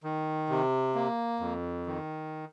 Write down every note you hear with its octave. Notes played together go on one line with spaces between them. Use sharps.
D#3
C3
A#3
F2
D#3